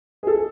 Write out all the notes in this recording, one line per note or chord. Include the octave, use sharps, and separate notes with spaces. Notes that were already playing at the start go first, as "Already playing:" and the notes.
G#4
A4